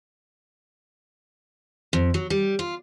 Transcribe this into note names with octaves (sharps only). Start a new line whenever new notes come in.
F2
F#3
G3
F4